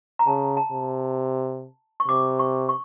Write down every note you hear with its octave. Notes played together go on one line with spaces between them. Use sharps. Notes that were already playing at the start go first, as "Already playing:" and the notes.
A#5
C#3 A5
A5
C3
C#6
C3 D6
C#6
C#6